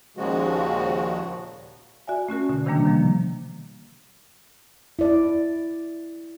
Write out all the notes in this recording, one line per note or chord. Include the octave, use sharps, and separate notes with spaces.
D#2 A#2 C#3 F3 G#3 F#4
F#4 D5 E5 G#5
A3 C#4 F#4 A#4
B2 D3
C3 D#3 E3 G3 A#3 D4
D#3 F3 A#3
E4 D5